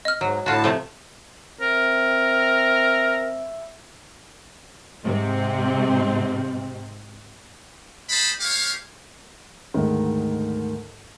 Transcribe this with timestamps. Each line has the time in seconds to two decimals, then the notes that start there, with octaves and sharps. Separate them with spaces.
0.05 D#5 F6
0.21 G#2 F#3
0.46 A2 D3 F4 F#4 A5
0.64 C3 F3 A3
1.61 C4 A#4 E5
5.03 G#2 C3 C4
8.09 G#3 C5 D#5 A5 B5
8.40 A3 G4 C#5 F5
9.74 D2 G#2 D#3